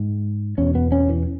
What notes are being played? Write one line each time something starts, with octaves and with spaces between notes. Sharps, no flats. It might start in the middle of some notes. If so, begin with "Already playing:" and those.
Already playing: G#2
E2 B2 C#4
B3
C#4
E3